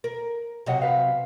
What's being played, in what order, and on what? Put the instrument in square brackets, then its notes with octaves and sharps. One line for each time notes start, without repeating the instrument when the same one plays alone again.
[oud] A#4
[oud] C3 F#3 [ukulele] C#5 D#5 F#5
[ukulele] B4 F5